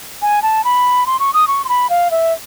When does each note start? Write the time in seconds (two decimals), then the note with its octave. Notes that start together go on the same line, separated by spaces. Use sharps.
0.22 G#5
0.42 A5
0.64 B5
1.06 C6
1.20 C#6
1.34 D#6
1.48 C#6
1.65 C6
1.69 B5
1.90 F5
2.11 E5